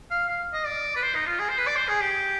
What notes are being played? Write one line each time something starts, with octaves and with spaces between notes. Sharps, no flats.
F5
F5
D#5
D5
B4
C5
D#4
F4
G#4
C5
B4
D5
C5
G#4
G4